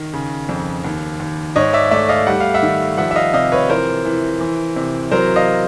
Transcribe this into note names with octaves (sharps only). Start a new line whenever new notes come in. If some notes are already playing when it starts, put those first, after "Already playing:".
Already playing: D#3
C#3
F2
D#2
D#2
G#2 C#5 D#5
D5 E5
A3 D5 E5
D#5 F5
G3 F#5
F5
E5 F#5
D#3
F3 E5 F#5
E5
D#5 F5
C3 D#5 F5
B4 C#5
E3 A#4 C5
E3
E3
C3
F#3 A#4 C5
D#5 F5